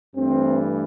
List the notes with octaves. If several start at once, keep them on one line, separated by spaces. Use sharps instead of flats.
G2 E3 A3 C4